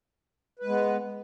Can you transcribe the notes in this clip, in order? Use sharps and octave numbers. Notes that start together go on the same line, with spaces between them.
G#3 B3 B4